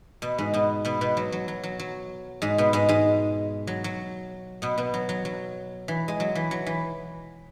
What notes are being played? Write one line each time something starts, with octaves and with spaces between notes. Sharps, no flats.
B2 B3
G#2 G#3
B2 B3
B2 B3
B2 B3
F#3
F#3
F#3
F#3
F#3
G#2 G#3
B2 B3
G#2 G#3
G#2 G#3
F#3
F#3
B2 B3
B2 B3
F#3
F#3
F#3
E3
G#3
F#3
E3
F#3
E3